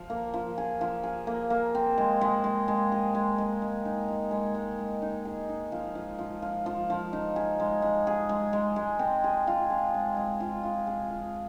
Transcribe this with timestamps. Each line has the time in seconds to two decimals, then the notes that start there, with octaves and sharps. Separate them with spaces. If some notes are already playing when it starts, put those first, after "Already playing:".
Already playing: F3
0.10 A#3
0.34 F3
0.58 G#4
0.81 F3
1.03 G#4
1.27 A#3
1.50 A#3
1.75 C4
1.98 G#3
2.21 G#3
2.44 G#3
2.68 G#3
2.92 G#4
3.15 G#3
3.38 G#3
3.62 G#3
3.85 D#4
4.08 G#3
4.31 G#3
4.55 G#3
4.79 G#3
5.02 D#4
5.25 G#4
5.49 D#4
5.72 F3
5.95 F3
6.19 F3
6.42 F3
6.66 F3
6.90 F3
7.13 D#4
7.36 G#4
7.60 G#3
7.82 G#3
8.07 G#4
8.29 G#3
8.53 G#3
8.76 G#3
8.99 C4
9.24 G#4
9.47 F4
9.70 G#4
9.94 G#3
10.17 G#3
10.40 F4
10.64 F4
10.87 G#4
11.10 F3